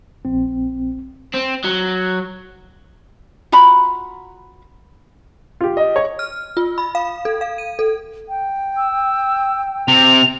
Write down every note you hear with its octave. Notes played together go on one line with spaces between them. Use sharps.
A#1 C4
C4
F#3
F4 F#4 A#5 B5
F4 G4
D#5
C#5
F6
F4
B5
F5
A4
F5
D#7
A4
G5
E6
C3 C4 F7